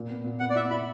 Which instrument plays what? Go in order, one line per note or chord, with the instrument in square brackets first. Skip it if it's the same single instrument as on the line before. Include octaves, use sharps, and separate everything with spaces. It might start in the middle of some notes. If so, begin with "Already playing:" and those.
Already playing: [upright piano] A#2
B3
A#2
[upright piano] B3 [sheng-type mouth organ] F#5
[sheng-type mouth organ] D5
[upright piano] E4 [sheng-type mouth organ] E5
[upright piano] E4 [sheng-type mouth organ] B5